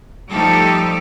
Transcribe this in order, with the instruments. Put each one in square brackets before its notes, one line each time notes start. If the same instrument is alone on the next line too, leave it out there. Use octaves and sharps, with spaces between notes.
[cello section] F3 G3 A3 D#4 G4 A4